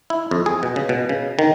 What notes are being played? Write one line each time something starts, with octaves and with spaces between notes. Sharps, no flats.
E4
F2
G#4
B2
C#3
B2
C#3
D#3